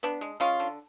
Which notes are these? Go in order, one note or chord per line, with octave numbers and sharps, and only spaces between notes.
B3 D4
G#3
G#3 C#4 F4
D3